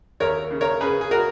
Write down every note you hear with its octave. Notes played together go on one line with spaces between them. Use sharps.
D#2 A#4 C#5
C#3
A#4 C#5
C#3 G#4 B4
G#4
F#4 A#4